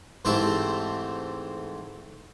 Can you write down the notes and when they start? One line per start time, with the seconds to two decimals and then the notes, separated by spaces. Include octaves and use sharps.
0.25 G#2 E3 A3 C4 G4 A4